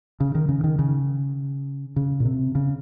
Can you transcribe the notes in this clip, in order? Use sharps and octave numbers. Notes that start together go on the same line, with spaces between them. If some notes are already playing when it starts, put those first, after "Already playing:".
C#3
D#3
C#3
D#3
C#3
C#3
A#2
C3
C#3